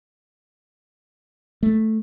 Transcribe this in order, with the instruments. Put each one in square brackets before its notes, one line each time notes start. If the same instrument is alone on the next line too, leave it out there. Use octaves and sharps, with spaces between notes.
[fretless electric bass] A3